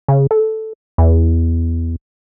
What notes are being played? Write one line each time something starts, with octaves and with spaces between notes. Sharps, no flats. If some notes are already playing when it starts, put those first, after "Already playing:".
C#3
A4
E2